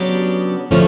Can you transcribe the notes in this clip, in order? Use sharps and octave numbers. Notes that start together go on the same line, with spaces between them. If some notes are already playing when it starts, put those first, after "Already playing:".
Already playing: C#3 F#3 B3 D4 G4
D3 F3 A3 C#4